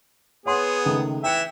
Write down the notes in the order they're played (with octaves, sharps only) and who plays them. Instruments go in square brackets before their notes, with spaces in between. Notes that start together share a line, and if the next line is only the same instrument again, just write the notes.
[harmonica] B3 G#4 [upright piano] C#5 F#5 C6
[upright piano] C#2 D#3 A3
[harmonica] E3 E5 [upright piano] G5 C#7